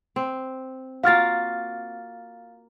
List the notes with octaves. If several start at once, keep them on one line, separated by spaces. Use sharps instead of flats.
C4
A#3 F4 F#4 F5 F6 A6